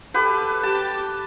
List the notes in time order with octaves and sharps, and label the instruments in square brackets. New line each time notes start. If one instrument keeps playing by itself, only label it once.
[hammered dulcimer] G4 B4 [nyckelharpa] A4
[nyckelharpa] G4 [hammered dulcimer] A5